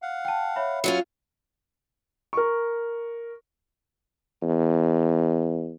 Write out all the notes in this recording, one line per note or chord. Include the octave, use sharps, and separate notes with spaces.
F5 F#5
G5 A5
C#5 E5 B5
F#3 C#4 F4
A#4 C#6
E2